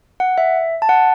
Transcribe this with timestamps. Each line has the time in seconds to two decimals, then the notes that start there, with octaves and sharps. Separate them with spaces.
0.20 F#5
0.38 E5
0.82 A5
0.89 F#5